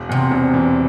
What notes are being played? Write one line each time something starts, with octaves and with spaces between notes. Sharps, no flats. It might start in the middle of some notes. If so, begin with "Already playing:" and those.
Already playing: E1
E2 C3
E1
E3